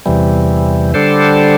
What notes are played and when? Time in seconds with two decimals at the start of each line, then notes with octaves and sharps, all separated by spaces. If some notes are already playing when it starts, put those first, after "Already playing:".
0.06 E2 C3 E3 G3
0.94 D3 G3 D4 A4 C5